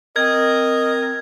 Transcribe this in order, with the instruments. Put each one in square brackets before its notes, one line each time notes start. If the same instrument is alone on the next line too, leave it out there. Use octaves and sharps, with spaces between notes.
[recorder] C4 [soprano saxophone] A#4 [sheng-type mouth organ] D#5 [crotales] G#6